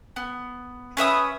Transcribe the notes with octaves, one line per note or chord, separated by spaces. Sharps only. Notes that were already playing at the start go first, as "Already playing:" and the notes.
B3
C#4 B4 E5 D#6